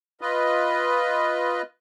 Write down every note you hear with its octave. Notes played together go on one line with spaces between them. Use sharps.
F4 B4 D#5